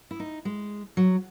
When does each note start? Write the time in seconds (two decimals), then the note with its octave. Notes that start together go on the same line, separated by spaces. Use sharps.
0.11 E4
0.20 D#4
0.45 G#3
0.97 F#3